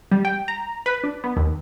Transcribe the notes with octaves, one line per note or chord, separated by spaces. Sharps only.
G3
G5
A#5
B4
D4
B3
D#2